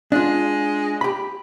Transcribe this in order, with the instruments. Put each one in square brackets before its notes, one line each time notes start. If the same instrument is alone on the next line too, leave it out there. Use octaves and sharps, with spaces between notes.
[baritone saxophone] G#3 [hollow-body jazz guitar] D4 F4
[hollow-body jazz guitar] G4 B5